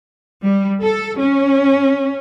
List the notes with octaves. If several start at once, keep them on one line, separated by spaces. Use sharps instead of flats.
G3
A4
C#4